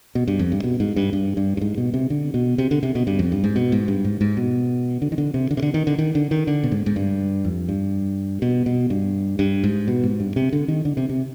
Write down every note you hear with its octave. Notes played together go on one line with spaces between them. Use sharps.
B2
G2
F2
G2
B2
G#2
G2
G2
G2
G2
G#2
B2
C3
D3
B2
C3
D3
C3
B2
G2
F2
G2
G#2
B2
G#2
G2
G#2
G#2
B2
D3
D#3
D3
C3
D3
C3
D3
D#3
D3
D#3
D3
D#3
D3
B2
G#2
G#2
G2
F2
G2
B2
B2
G2
G2
G#2
B2
G#2
G2
C3
D3
D#3
D3
C3
C3